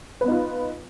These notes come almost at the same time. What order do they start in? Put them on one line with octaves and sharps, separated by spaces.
B4 B3 D#4 F4